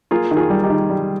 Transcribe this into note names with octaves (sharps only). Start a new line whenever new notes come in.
A#3 F4 G#4
D#3
F4 G#4
G3
D#4 G4
D#3
G3